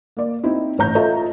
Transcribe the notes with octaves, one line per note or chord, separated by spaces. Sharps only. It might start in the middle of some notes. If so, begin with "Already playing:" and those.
A#3 D5
C4 D#4 E4
A1 C#5 A#5 G6
F4 A4 C#5 D#5 E5 A#5